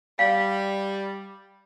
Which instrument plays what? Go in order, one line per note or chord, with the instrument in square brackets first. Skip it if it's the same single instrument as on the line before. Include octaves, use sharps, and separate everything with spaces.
[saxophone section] G3 [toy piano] F5